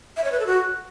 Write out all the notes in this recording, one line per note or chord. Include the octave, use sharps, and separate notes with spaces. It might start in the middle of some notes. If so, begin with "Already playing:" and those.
E5
C#5
B4
A4
F#4